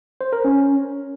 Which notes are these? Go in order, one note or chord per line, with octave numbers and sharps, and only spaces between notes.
C5
A#4
C#4